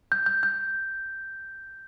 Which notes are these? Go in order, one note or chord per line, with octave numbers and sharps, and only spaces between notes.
G6
G6
G6